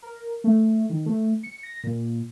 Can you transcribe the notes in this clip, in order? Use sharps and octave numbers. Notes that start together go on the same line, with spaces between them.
A#4
A3
D#3
A3
C#7
A#6
A#2